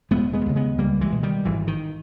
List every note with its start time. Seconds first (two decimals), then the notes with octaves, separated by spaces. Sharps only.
0.11 E1 G#3 B3
0.33 G#3 B3
0.46 D#2 C#3
0.56 G#3 B3
0.78 C#2 G3 A#3
1.01 E3 G#3
1.12 B2
1.23 D#3 G3
1.45 G#1 E3
1.67 D#3